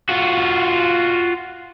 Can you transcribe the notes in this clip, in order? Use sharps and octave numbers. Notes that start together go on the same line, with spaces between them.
F4 F#4